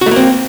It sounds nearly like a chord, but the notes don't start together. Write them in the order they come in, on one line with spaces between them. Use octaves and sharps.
F#4 A3 A#3 C4